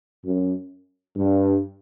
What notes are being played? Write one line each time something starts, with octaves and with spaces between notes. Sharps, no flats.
F#2
G2